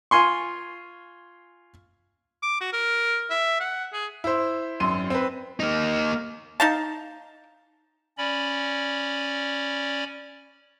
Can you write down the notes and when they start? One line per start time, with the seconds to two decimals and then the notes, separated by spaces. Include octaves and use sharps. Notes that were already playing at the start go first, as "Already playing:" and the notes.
0.11 F4 G#5 C6 C#6
2.42 D6
2.61 F#4
2.73 A#4
3.30 E5
3.60 F#5
3.93 G#4
4.24 E4 C5
4.80 G#1 F#2 C6 D#7
5.10 C4 B4
5.60 A#3 D#4
6.60 D#4 F5 A5
8.18 C#4 D5 B5